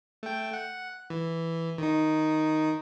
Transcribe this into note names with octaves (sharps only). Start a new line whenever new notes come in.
A3 G5
F#5
E3
D#3 D#4